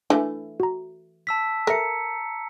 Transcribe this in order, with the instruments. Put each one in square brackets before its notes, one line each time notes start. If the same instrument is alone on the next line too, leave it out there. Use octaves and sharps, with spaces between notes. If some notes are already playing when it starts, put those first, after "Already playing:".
[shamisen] E3 A3 [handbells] D4
[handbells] F#4 A#5
[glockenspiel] A5 E6 B6
[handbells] A4 E5 [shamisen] A#4 [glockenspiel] A#5 C#7